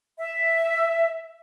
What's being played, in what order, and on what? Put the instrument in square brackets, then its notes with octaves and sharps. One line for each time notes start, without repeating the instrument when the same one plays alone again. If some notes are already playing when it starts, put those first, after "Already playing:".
[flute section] E5